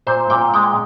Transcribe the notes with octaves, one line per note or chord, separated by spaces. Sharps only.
A#2 C5
A#2 G5
G#3 G5